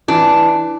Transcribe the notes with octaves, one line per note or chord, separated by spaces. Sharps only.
E3 D4